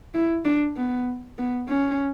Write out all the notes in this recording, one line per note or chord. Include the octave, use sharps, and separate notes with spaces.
E4
D4
B3
B3
C#4